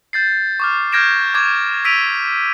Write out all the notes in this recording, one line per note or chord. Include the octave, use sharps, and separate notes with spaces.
G6 A6 C7
C#6 D6 F6
F6 G6 G#6 A#6 D7 E7
C#6 D6 G#6
E6 B6 D7 D#7 F7